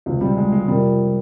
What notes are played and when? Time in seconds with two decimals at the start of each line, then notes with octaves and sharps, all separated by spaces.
0.06 C#2 C3 F3
0.21 G3
0.37 G#3
0.52 G#3
0.68 F2 C3 F3 G3 A#3